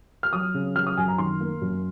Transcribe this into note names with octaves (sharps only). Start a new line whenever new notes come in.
F6
F#3 D#6
C#3
F#3 F6
D#6
F#2 G#5
A#5
D#3 C6
A#3
F#2